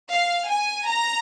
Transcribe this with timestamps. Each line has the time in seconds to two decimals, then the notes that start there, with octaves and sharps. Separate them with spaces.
0.10 F5
0.50 G#5
0.88 A#5